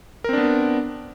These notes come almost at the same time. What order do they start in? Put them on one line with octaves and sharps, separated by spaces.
A#4 C4 D4 B3